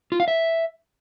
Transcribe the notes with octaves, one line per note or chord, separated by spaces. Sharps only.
F4
F5
E5